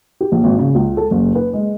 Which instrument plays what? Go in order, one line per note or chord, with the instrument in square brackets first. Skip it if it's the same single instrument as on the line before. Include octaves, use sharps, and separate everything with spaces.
[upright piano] G4
A#1
G#1
C#3
C#2
A4
F#1
B4
G#3